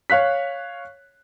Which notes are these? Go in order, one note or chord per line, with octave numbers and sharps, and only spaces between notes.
C#5 F5 F#6 B6